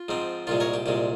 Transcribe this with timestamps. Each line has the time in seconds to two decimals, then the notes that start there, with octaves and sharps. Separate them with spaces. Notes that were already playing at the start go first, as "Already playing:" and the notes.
Already playing: F4
0.08 G#2 F3 C4 D#4
0.47 C2 A#2 G#3 F4
0.60 A#4 C#5
0.74 G4
0.86 C2 A#2 G#3 G4